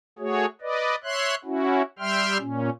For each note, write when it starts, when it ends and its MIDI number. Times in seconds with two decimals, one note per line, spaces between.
0.19 0.46 57
0.19 0.46 66
0.19 0.46 68
0.19 0.46 73
0.61 0.96 71
0.61 0.96 74
0.61 0.96 75
1.04 1.35 73
1.04 1.35 76
1.04 1.35 84
1.04 1.35 90
1.45 1.82 61
1.45 1.82 64
1.45 1.82 66
1.99 2.38 55
1.99 2.38 76
1.99 2.38 79
1.99 2.38 84
1.99 2.38 89
2.38 2.70 46
2.38 2.70 61